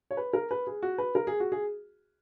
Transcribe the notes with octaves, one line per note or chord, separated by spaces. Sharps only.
C#5
B4
A#4
B4
G#4
F#4
B4
A#4
G#4
F#4
G#4